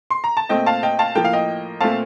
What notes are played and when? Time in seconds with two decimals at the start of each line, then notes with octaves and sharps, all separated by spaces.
0.10 C6
0.24 A#5
0.37 A5
0.49 A#2 A3 C4 D#5 G5
0.66 F5 A5
0.83 D#5 G5
0.99 F5 A5
1.15 A2 F3 A#3 G5
1.24 F5
1.33 D#5 G5
1.80 A#2 A3 C4 F5 A5